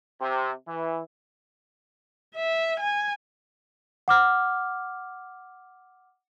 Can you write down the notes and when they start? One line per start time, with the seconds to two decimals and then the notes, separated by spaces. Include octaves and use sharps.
0.21 C3
0.68 E3
2.35 E5
2.80 G#5
4.08 F#5 D6 F6